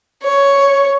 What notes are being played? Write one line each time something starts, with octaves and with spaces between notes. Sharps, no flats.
C#5